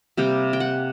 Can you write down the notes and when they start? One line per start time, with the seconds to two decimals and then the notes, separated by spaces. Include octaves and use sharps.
0.17 C3 G3 A#3 G5
0.53 G5
0.60 F#5